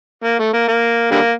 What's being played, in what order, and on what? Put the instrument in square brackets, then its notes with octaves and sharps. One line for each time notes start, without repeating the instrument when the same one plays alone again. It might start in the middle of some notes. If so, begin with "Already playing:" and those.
[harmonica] A#3
A3
A#3
A#3
D3 G3 A#3